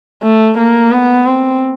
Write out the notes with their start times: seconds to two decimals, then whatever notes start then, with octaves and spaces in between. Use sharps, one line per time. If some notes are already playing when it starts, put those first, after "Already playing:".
0.23 A3
0.58 A#3
0.92 B3
1.26 C4